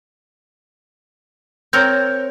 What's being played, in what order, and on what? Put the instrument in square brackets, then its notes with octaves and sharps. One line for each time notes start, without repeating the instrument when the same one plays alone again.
[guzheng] C4 A#4 C#5 [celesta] G6